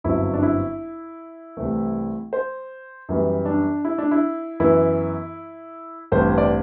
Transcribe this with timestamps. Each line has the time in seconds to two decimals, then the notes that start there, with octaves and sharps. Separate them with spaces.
0.04 G1 F#2 F#3 C4 E4
0.34 D4
0.43 E4
1.57 C2 C3 E3 A3 C4
2.33 C5
3.09 F#2 E3 G3 B3
3.45 D4
3.85 E4
3.98 D4
4.11 E4
4.60 F#2 E3 B3 E4
6.12 A1 G2 E3 G3 C4 C5
6.38 D5